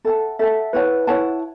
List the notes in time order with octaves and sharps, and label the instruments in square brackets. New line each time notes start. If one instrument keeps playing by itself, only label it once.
[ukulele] A4 F#5 A5 [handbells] E5
[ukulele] A4 F#5 A5 [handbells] E5
[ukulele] E4 C#5 F#5 A5 [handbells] B4
[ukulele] E4 C#5 F#5 A5